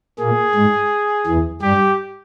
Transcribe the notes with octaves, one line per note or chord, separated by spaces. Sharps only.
A#2 A#3 G#4
G#2 G#3
E2 E3
G2 G3 G4